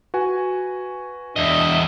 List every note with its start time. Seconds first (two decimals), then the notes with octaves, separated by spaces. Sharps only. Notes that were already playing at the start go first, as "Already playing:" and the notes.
0.14 F#4 B4 G#5
1.36 E2 D4 D#5 E5